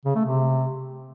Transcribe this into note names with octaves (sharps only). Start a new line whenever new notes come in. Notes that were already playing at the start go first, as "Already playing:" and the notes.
C#3
A3
C3